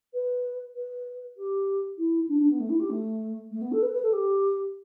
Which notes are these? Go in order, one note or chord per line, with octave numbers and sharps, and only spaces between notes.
B4
B4
G4
E4
D4
D4
B3
A3
E4
G4
A3
A3
B3
A4
B4
B4
A4
G4